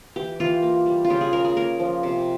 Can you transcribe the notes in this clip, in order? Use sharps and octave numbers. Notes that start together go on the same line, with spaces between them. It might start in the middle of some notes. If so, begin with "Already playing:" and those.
E3 G4
E3 F4
A#3
G3
F4
C#3 G4
G#4
C#3 A#4
G#4
A#3 A#4
F3
C3